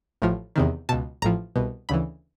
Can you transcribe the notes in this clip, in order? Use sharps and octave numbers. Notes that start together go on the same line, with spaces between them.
A1 A2 F3
E2 C3 D#3
C#2 B2 A5
A1 A2 F3 A#5
C2 B2
D2 C#3 E3 B5